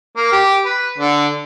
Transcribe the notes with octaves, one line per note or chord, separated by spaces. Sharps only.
A#3
G4
B4
D3